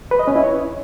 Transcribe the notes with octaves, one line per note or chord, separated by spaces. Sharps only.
B4
D#5
C#4
E4
C#5